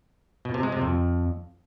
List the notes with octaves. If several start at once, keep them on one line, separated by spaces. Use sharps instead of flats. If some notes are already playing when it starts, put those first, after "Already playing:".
B2
C3
G#3
C3
F2